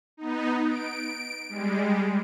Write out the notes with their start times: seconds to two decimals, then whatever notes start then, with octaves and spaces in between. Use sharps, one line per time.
0.17 B3 D#4
0.68 D7
1.48 G3 G#3